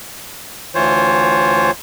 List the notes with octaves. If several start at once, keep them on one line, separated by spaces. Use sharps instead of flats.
D2 E3 F4 C5 C#5